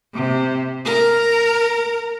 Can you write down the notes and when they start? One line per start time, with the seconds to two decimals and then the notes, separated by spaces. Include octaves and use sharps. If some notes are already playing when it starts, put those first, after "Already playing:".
0.14 C3
0.85 A#4